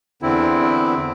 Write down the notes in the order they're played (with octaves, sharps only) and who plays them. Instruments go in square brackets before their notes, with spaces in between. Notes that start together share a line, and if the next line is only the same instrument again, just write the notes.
[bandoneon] E2 D3 C4 E4